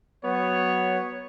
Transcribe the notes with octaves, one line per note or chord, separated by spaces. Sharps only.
F#3 B3 C#5